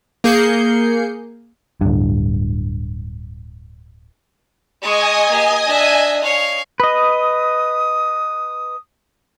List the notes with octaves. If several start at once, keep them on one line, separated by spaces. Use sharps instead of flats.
A#3 G#4 G6 C7 C#7
D1 G2
G#3 D#5 G#5 C#6 D#6
A#3 G4
D4 E5
C#5 F5
B4 D#5 D#6